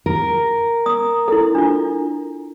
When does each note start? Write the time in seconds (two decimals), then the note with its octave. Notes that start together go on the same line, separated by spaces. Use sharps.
0.06 A#4
0.86 D#6
1.28 E4 A4
1.55 D4 F4